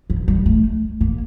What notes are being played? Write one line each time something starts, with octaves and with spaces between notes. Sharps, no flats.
F3
G3
A3
A#3